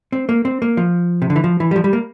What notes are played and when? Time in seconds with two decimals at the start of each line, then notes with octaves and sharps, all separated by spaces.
0.12 C4
0.29 A#3
0.45 C4
0.62 A#3
0.77 F3
1.22 C3
1.30 D3
1.36 E3
1.44 F3
1.60 E3
1.71 G3
1.76 F3
1.84 G3
1.93 A#3